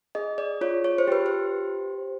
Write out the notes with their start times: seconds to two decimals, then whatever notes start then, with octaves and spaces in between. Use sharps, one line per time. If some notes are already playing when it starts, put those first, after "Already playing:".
0.15 G#4 D#5
0.38 D5
0.61 F4 C#5
0.84 C#5
0.98 C5
1.08 G4 B4
1.26 C5